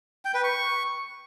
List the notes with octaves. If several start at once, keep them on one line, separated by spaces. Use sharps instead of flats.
G5
B4
C#6